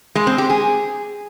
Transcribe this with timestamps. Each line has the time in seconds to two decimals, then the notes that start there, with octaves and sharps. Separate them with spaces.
0.15 G#3
0.27 C4
0.38 G4
0.50 G#4